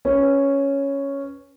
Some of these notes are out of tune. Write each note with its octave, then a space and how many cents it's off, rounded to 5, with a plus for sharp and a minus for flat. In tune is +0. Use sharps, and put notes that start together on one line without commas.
C#4 +0 B4 +0